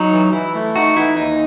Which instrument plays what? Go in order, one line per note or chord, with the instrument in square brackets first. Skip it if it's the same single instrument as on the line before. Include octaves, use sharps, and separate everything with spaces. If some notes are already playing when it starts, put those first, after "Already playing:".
Already playing: [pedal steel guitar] F#3 [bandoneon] D#4
[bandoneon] E3
[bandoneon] E3 [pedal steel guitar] E4
[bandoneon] A3
[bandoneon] D#4 [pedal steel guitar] F#4
[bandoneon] E3 [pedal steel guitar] E4
[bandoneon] D#2 [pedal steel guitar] D#4